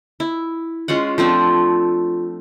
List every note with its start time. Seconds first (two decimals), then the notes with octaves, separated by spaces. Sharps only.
0.20 E4
0.88 G#3 C#4 F4 F#5
1.18 F3 A3 C4 D4